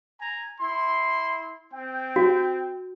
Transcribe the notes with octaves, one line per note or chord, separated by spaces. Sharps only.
G#5 A#5
E4 C6
C4 G5
F#4